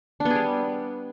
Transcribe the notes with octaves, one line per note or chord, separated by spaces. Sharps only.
D4
B3
G#4
G3